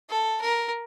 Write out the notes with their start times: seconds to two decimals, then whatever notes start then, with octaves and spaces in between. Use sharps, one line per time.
0.10 A4
0.42 A#4